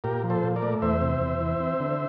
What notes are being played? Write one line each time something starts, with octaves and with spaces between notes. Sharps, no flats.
A#2 G4 A#4
F3
A4 C5
A#2
A#4 D5
A3
E2 C5 E5
C3
E2
E3
C4
D3